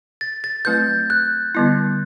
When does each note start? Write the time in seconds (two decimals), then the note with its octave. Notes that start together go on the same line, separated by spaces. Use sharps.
0.21 A6
0.44 A6
0.65 F#3 A3 C4 E4 B4 G6
1.10 F#6
1.55 D3 G3 B3 E4